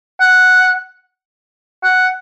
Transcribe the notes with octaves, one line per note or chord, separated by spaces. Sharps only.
F#5
F#5